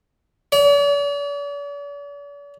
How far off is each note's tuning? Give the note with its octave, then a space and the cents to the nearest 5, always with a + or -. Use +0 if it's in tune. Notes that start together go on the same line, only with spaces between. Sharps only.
D5 -45